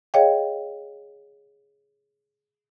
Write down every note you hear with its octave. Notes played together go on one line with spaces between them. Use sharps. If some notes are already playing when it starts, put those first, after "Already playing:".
G#4 C#5 D#5 F5 G5